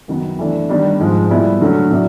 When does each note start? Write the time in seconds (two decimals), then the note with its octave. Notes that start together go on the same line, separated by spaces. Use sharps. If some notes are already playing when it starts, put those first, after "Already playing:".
0.08 F#2 D#3 F#3 B3
0.39 E3 A3 D4
0.69 D#3 G3 B3 D4
1.00 G#2 F3 G#3
1.30 A#2 G3 B3 E4
1.61 D3 F#3 A3 C#4
1.91 A2 F#3 B3 D4